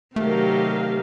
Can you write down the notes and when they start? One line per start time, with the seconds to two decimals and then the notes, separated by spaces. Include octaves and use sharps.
0.16 C3 D#3 F#3 A3 G4 A#4 F5